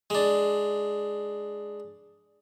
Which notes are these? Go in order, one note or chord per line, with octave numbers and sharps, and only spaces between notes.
G#3 D4